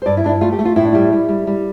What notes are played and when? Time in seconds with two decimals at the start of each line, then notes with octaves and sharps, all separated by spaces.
0.02 C5
0.06 G2 D5
0.17 E4
0.24 G2 D4
0.29 E4
0.41 A3 F4
0.52 G4
0.59 A3
0.65 F4
0.76 A2 E4
0.85 D4
0.93 G3 E4
1.12 G3
1.29 G3
1.47 G3